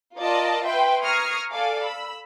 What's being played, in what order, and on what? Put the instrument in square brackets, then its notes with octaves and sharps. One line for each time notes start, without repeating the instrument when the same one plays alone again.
[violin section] F4 A#4 D5 D#5 A5
B4 E5 G5 C6
A#5 C#6 D#6 F6 G#6 C7
A4 D5 F5 G#5 D6
B5 E6